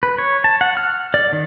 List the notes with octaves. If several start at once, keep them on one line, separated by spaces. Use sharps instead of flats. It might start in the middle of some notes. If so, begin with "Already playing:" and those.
B4
C#5
A5
F#5
F6
D5
D#3